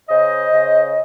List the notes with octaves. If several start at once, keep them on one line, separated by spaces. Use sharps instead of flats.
C#3 C5 D#5
C#3